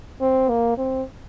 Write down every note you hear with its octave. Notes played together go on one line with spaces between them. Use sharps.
C4
A#3
C4